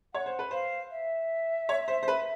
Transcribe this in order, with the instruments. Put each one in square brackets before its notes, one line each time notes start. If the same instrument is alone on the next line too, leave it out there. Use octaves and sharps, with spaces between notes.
[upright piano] C#5 [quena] F#5
[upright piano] C5
B4
[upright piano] C5 [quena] F5
[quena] E5
[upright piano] C#5
C5
C5
B4